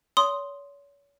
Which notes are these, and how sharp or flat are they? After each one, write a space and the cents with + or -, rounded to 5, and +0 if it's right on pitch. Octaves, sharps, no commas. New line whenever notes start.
C#5 +35 C6 +0 D#6 +0